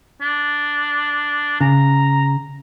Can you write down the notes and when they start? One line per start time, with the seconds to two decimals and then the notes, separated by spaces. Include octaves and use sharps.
0.21 D4
1.61 C#3 A#5